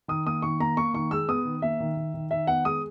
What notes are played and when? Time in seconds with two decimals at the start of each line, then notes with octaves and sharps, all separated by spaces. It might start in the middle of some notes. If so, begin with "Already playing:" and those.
0.08 D#3 D#6
0.26 A#3 D#6
0.42 D#3 C#6
0.60 A#3 A#5
0.77 A#3 C#6
0.94 D#3 C#6
1.11 G#3 E6
1.28 B3 D#6
1.45 D#3
1.62 A#3 E5
1.80 D#3
1.97 D#3
2.14 D#3
2.31 D#3 E5
2.47 B3 F#5
2.65 G#3 D#6